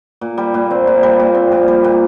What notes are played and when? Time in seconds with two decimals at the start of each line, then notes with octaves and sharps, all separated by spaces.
0.21 A#2
0.38 G3
0.54 A#2
0.71 C4
0.87 A#2
1.03 G3
1.20 A#2
1.35 C4
1.52 A#2
1.68 G3
1.84 A#2